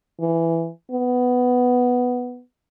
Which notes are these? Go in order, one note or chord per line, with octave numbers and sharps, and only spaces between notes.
E3
B3